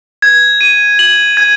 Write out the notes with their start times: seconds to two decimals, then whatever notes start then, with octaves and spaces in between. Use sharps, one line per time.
0.22 G#6
0.61 D#7
0.99 F#7
1.37 G#6